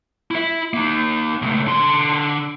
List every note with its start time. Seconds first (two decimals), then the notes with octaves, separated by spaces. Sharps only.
0.31 E4 E5
0.73 A#3 D#4
1.42 C#2 A3
1.67 D3 C6